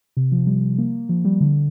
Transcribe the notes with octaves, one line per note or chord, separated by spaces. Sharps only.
C3
F3
G3
A#3
F3
G3
D3